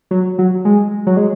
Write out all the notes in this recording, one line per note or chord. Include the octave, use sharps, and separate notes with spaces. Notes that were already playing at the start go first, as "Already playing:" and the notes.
F#3
F#3
G#3
F#3
G#3